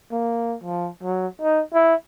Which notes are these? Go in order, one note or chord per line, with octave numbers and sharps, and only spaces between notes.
A#3
F3
F#3
D#4
E4